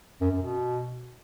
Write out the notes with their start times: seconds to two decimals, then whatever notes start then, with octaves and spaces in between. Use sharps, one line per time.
0.21 F#2
0.31 F#2
0.42 B2